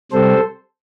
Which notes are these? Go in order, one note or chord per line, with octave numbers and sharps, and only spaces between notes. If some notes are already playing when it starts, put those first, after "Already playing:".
C3 G3 C4 A4 C5